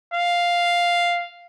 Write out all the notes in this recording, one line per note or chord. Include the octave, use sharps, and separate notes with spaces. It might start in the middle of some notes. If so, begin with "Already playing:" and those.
F5